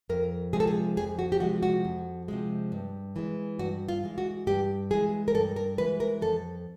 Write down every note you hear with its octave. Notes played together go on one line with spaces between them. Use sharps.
F2 A#4
C3 F3 G#3 G#4
A4
G#4
F2 G#4
F#4
G4
C3 F3 G#3 F#4
F#4
F2
C3 F3 G#3
G2
E3 G#3
G2 F#4
F4
E3 G#3
F#4
G2 G4
E3 G#3 G#4
A#4
G2 A4
A#4
E3 G#3 B4
A#4
F2 A4